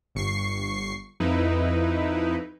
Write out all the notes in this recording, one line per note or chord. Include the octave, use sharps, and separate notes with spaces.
G1 C#6 C7
F2 D#4 E4 B4